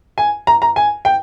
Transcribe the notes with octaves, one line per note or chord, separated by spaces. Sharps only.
G#5
A#5
A#5
G#5
G5